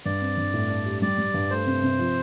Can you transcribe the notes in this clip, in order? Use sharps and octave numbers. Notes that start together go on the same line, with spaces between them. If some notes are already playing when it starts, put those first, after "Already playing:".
G2 D5
C4
G2
A2
D4
G4
G3 D5
G3
G2
A3 C5
C3
C3
F3